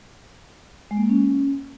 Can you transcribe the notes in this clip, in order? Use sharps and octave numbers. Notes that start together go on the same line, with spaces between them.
G#3
A#3
G#3
C#4